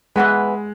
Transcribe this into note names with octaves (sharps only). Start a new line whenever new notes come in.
E3 G#3 B3 F#4 B4